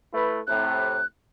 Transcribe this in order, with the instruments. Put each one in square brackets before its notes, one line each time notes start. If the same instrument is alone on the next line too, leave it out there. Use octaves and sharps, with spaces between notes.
[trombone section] A3 E4 B4
[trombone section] A2 C3 [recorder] F#6